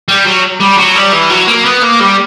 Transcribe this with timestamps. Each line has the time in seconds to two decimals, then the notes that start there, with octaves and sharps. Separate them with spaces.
0.08 G3
0.25 F#3
0.60 G3
0.78 F#3
0.96 G3
1.12 E3
1.30 F#3
1.48 A#3
1.65 B3
1.83 A#3
2.00 G3